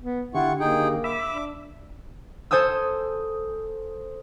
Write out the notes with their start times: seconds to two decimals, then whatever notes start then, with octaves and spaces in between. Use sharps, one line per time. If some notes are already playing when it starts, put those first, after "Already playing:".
0.01 B3
0.34 D3 E4 F4 G4 F#5 C#6
0.60 A#3 D#4 G#4 G5
1.04 E5 B5 D6 E6
1.31 D4
2.51 A4 C5 G#5 D#6 E6